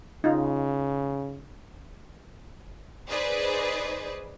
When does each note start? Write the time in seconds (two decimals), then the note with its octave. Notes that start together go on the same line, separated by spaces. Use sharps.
0.24 C#3 D#4 F4
3.08 D#4 G#4 B4 C5 D5